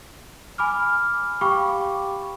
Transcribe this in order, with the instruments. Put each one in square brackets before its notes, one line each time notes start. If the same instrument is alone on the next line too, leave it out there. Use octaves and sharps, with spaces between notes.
[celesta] G#5 B5 D6 F6
G4 F5 G5 B5 C#6 D6